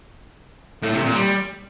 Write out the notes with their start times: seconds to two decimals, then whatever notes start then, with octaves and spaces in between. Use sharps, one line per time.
0.82 A2
0.93 C3
1.03 A#2
1.14 G3